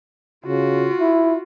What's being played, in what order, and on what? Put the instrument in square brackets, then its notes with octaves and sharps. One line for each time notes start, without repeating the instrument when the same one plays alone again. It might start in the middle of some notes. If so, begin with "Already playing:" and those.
[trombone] C#3 [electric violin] F4 F#4
[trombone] E4